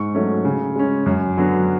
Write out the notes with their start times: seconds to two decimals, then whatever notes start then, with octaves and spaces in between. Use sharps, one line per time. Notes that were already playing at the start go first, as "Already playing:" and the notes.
Already playing: G#2 C#6
0.14 F#3 A3 C#4
0.45 C#3
0.76 G#3 C#4
1.06 F#2
1.37 D3 F#3 B3